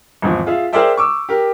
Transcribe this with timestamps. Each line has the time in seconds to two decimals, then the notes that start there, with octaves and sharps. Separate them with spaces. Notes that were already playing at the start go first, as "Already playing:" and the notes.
0.22 G#1 E2 F3
0.46 F4 G#4 E5 F5
0.73 G#4 A#4 C5 D5 E5 G5
0.97 C#6 D6 E6
1.29 G4 A#4